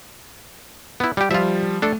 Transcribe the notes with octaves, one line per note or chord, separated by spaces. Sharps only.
B3 E4
G3 G4
F3 G3 F4 E5
A3 D4 A4